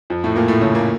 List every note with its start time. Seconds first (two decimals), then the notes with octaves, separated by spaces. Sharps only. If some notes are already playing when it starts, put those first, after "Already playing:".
0.10 F2 F3
0.24 A2 A3
0.36 A#2 A#3
0.48 A2 A3
0.61 C#3 C#4
0.74 A#2 A#3